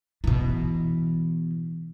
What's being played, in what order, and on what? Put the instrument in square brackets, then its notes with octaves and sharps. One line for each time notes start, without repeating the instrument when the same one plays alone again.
[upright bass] B2 E3